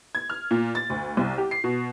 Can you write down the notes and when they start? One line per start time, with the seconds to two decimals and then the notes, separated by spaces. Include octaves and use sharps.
0.15 G#6
0.30 F6
0.51 A#2
0.75 A6
0.90 D2
1.17 C2
1.38 G4
1.51 C7
1.64 B2